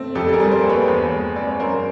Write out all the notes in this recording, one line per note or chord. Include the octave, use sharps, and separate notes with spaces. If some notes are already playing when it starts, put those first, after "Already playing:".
Already playing: A3 C4
F2 G4 A4
A4
G#4 A#4
G3
A#4 C5
A#3
B4 C#5
E2
G#3
C4 D5
C#5
F#2 A#4 C5